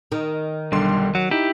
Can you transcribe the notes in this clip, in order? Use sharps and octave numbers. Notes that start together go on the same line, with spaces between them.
D#3
B1 D3 G3 C6
F#3 F#5
D#4 E4 G4